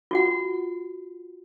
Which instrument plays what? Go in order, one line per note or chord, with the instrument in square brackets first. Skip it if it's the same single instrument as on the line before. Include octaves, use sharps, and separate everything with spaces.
[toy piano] F4 F#4 F#5